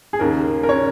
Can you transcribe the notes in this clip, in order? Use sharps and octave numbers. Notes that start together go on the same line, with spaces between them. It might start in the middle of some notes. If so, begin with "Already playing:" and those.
G#4
D#2 C#3 A#4
A#4
C#3 C#5